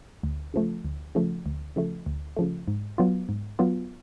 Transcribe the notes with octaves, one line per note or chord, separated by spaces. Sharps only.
D2
C#3 F3 A3
D2
C#3 F3 A3
D2
C#3 F3 A3
D2
C#3 F3 A3
G#2
F#3 B3 F4
G#2
F#3 B3 F4